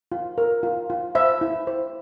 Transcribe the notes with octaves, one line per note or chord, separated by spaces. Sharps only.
F4
A#4
F4
F4
C5 E5
E4
C5